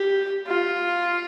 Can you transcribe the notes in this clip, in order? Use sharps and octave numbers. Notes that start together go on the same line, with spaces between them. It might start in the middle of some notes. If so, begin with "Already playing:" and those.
Already playing: G4
F4